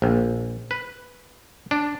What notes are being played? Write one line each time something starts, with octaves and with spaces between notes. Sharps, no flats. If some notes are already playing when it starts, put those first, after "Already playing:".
A#1
B4
D4